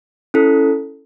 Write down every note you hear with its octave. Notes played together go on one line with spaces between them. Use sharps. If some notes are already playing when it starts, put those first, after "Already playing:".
C#4 E4 A4